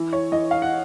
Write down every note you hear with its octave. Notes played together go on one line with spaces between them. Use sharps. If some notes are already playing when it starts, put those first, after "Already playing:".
Already playing: E3
C#5
E3 D#5
F5
F#5